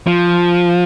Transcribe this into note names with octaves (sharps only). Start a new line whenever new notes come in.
F3